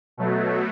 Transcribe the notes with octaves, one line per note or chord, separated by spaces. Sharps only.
B2 F#3 A3